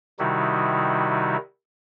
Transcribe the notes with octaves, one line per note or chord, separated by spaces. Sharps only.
C3 D#3 G3 D#4 E4 F#4